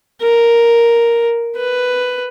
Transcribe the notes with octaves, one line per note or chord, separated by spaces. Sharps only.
A#4
B4